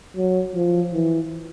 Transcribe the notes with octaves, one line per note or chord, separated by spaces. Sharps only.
F#3
F3
E3